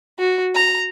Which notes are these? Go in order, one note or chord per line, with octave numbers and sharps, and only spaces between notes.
F#4
A#5